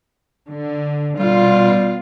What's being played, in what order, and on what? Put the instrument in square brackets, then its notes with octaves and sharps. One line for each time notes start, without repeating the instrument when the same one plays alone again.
[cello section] D3
[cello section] B2 F4 [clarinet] G3